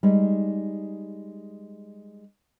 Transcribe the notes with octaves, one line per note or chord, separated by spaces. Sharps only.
G3 G#3 D#4